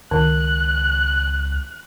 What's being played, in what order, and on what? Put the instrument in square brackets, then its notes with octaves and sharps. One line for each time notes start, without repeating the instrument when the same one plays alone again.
[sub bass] C#2 [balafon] D#3 [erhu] F#6